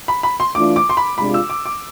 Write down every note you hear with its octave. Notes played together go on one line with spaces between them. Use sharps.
B5
B5
C6
E3 A3 D4 F4 D6
D6
C6
B5
C3 G#3 D4 F4 B5
E6
D6
D6